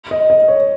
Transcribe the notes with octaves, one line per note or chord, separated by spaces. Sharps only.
D#5
D#5
C#5